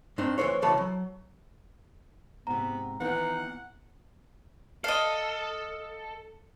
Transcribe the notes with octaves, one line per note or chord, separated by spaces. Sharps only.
G2 C4 D4 D#4
D2 E3 F3 A#4 C5 C#5
C#2 B2 E3 C#5 A5 B5
F#3
G#2 C3 B3 A#5
D#3 E3 B3 D#4 F#5
A4 D#5 F5